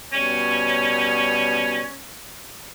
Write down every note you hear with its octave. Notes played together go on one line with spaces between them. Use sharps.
B2 G3 C#4 C#5